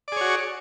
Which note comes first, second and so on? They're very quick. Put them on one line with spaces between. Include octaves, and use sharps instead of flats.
D5 G#4 C#5 F#4